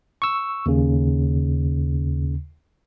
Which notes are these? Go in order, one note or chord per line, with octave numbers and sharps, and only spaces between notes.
C#6 E6
D#2 C#3